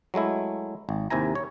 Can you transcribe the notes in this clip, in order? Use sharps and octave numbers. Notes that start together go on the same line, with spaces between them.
F#3 G#3 A3 E4
G#1
D#2 C3 E4 G#5 A#5
C#5